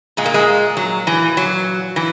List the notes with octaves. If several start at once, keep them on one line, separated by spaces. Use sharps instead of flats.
A#2 G#3
A#3
G#3
F#3
E3
F#3
E3